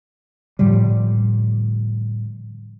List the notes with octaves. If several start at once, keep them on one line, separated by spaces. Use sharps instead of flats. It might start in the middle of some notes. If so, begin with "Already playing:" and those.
A2 D3 F3 G3